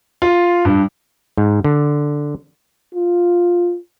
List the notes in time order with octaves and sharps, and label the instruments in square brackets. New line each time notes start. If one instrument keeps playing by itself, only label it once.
[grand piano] F4
G2
[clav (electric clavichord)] G#2
D3
[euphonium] F4